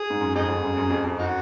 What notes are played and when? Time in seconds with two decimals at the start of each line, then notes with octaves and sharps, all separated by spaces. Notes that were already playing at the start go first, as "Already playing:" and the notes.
Already playing: G#4
0.10 G#2
0.20 F#2
0.35 F2 D#4 G#4
0.48 F2
0.63 F#2
0.77 F#2
0.90 F2
1.04 F2
1.19 D#4 F#4